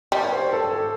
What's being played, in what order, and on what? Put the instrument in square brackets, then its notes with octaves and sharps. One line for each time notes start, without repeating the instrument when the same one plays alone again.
[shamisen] G3 [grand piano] D5
[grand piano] C#5
C5
A4
A4